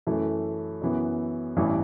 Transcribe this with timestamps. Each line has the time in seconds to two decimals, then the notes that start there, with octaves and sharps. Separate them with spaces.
0.07 F#2 E3 A3
0.82 F#2 E3 B3
1.57 A1 G2 E3